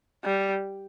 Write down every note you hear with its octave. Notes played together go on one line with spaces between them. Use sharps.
G3